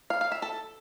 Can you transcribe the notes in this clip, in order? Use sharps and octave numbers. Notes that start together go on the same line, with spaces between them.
F5
F5
E5
A4